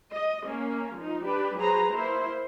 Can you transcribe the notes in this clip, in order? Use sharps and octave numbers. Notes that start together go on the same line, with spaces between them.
D#5
A#3 C#4
F3 D#4
D4 G4 B4
F#3 G#4 B4 C5 A#5
A#3 E4 C5